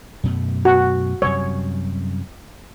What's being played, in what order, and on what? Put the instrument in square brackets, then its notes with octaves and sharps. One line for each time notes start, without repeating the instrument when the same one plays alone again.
[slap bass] F#2 B2 A3
[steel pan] F#4
[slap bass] F#2 C3 G3 [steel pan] C#5